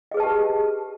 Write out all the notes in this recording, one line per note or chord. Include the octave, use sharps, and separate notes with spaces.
G4 G#4 B4 D#5 A5